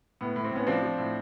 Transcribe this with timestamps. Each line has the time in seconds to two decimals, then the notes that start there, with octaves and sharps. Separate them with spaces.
0.21 A2 B3
0.36 A2
0.44 C4
0.52 A2 B3 C#4
0.67 F3 C4 D4
0.83 F3
0.98 A2